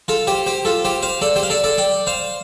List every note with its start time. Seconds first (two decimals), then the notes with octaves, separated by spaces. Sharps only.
0.08 F4 A4
0.27 G4 C5
0.46 G4 C5
0.65 F4 A4
0.85 G4 C5
1.02 C5 F5
1.22 A4 D5
1.36 G4 C5
1.43 F5
1.50 A4 D5
1.64 A4 D5
1.78 D5 G5
2.07 C5 F5